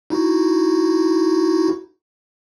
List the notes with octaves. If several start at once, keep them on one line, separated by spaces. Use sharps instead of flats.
D#4 E4 F#4